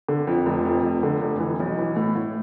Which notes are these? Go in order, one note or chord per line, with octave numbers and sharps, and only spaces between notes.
D3
F2
F1
F2
F1
D3
F1
E3
B1
E3
A2
A2